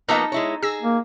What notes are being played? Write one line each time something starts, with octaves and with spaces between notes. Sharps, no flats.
F3 A#3 B3 D#4 A4 D#5 A#5 E6
G#3 E4 C#5
G#4 E6 A#6
A#3